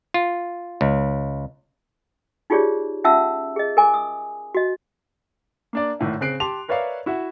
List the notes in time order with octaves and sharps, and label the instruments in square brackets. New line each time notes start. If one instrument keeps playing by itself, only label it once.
[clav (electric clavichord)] F4
C#2
[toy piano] D#4 F4 G4 G#4 C#5 D5
C#4 F4 E5 F#5 A5 E6
G#4 D#5
A#4 G#5 D6
D#6
F#4 D#5
[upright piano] A#3 D4 D5
G#1 A2 E5
C#3 C4 F#6 C7 D7
G4 A5 C6 F7
A#4 B4 C#5 D5 E5 F5
E4 F#4 E5 F#5